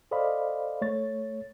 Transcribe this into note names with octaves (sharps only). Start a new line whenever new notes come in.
A4 C5 D5 D#5 F5 B5
A3 C#5 A6